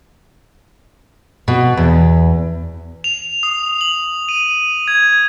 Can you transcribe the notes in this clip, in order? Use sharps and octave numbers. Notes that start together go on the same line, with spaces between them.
B2
E2
F7
D#6
F#7
D#7
G#6